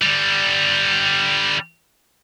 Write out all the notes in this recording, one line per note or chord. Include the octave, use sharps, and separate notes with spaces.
D3 G3